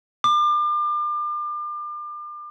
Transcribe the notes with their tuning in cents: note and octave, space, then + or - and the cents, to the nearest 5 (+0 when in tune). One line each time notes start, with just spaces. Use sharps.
D6 +35